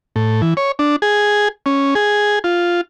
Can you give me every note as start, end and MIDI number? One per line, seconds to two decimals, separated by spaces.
0.16 0.41 45
0.42 0.54 52
0.57 0.72 73
0.79 0.96 62
1.02 1.48 68
1.66 1.94 61
1.95 2.39 68
2.44 2.81 65